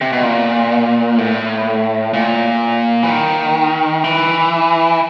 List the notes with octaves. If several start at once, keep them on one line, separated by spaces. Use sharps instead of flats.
C3
B2
A#2
A2
A#2
E3
D#3
E3